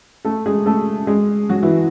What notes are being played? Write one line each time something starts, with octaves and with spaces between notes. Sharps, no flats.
A3 A4
G#3 G#4
A3 A4
G#3 G#4
F#3 F#4
E3 E4